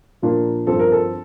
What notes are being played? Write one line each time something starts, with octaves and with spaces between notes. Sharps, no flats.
A#2 F3 A#3 D4
G2 F3 C4 A4
A#4
A4